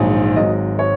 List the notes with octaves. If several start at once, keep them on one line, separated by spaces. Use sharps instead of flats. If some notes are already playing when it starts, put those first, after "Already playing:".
Already playing: A#1 G#2 D#3 F#3
G#1 G#2 F#3 D#5
C#5